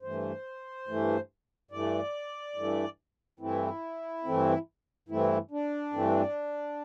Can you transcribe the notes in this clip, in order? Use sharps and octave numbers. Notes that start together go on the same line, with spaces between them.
G2 E3 A3 C5
G2 E3 A3
G2 E3 A3 D5
G2 E3 A3
G2 E3 A3 C4 E4
G2 E3 A3 C4
G2 E3 A3 C4 E4
D4
G2 E3 A3 C4